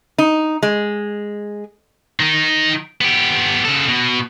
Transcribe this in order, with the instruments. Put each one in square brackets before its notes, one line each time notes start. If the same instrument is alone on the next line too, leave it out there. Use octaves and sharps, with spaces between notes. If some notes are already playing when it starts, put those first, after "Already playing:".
[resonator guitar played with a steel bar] D#4
G#3
[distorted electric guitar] D#3 D#4
B3 G4
C#3 A4
B2